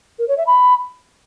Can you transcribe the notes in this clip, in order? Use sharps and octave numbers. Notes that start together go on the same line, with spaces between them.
A#4
C#5
E5
B5